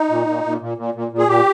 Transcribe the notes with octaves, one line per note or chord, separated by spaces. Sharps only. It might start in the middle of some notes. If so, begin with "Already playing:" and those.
Already playing: D#4
A#2
A#2
A#2
A#2
A#2
A#2
A#2
G#4
A#2 G4